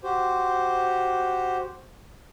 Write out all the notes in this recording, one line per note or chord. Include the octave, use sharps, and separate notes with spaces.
F#4 G4 C5